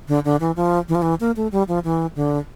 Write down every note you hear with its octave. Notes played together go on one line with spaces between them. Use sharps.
D3
D3
E3
F3
E3
F3
E3
A#3
A3
G3
F3
E3
D3